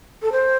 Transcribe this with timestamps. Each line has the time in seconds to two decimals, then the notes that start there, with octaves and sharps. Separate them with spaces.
0.22 A4
0.32 C5